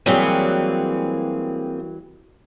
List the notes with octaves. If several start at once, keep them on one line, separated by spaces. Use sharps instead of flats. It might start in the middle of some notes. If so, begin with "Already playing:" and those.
E3 F#3 G3 A#3 C4 G#4